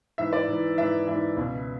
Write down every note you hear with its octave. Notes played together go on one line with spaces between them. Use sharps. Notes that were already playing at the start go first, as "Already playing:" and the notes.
G#2 E3 E5
D5
G#2 E3
G#2 E3 E5
G#2 E3 E5
C#2 B2